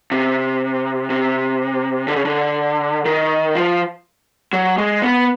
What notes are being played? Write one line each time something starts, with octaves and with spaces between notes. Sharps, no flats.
C3
C3
D3
C#3
D3
D#3
F3
F#3
G#3
B3